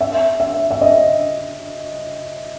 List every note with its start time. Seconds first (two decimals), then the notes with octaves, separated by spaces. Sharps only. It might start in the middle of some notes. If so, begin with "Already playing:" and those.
0.01 E5
0.40 E5
0.71 E5
0.81 D#5